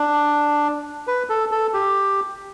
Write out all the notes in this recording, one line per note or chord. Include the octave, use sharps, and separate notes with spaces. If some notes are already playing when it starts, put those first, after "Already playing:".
Already playing: D4
B4
A4
A4
G4